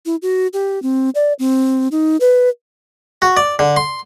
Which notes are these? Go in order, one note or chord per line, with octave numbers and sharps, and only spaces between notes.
E4
F#4
G4
C4
D5
C4
D#4
B4
F#4
D5
D3
C6